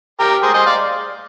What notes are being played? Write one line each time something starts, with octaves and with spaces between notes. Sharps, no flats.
G4 A#4
G#4 C5
C5 D#5
D5 F5